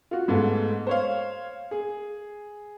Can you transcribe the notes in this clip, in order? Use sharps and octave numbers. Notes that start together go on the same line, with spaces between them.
F4 F#4
G#2 G#3 A3 B3
C5 C#5 F5
G#4